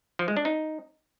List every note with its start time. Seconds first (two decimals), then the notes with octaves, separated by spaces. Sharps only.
0.19 F3
0.28 G#3
0.37 D4
0.45 D#4